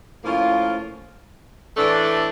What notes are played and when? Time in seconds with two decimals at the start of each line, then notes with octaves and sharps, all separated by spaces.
0.24 A2 F3 A#3 C#4 F4
1.77 A2 E3 A3 D4